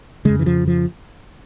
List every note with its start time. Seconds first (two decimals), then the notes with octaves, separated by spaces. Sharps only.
0.25 F2 C#3 G#3
0.39 E3
0.46 F3
0.68 F3